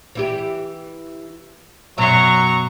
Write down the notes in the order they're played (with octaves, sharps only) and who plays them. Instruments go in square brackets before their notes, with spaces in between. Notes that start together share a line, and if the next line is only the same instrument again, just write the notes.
[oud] E3 E4 G4
[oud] F#2 B2 E5 [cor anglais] F#3 [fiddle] A#5 C#6